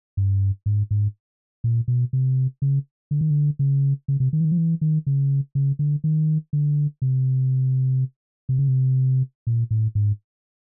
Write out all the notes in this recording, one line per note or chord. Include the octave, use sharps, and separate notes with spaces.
G2
G#2
G#2
A#2
B2
C3
C#3
D3
D#3
D3
C#3
C#3
C3
D#3
E3
D#3
F3
E3
D#3
C#3
C#3
D3
D#3
D3
C3
C3
C#3
C3
A#2
A2
G#2